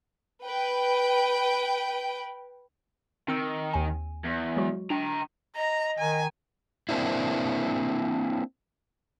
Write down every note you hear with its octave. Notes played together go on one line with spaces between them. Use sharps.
B4 G5
D#3 C4 E6
D#2 G#5
E2
F#3 G#3 F#4
D4 G5 A#5
D#5 A#5
D#3 G#5
A#3 C4 D4 E4